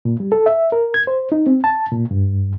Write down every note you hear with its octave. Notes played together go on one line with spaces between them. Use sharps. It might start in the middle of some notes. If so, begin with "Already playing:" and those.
A#2
G3
A4
E5
A#4
G#6
C5
D#4
C4
A5
A#2
G2